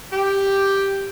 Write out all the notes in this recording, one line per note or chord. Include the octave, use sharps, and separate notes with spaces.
G4